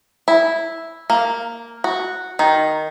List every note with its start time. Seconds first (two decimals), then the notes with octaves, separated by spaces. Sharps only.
0.28 E4
1.10 A#3
1.84 F#4
2.39 D#3